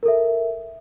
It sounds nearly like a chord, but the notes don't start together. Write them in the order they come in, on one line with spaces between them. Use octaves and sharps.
A#4 A4 E5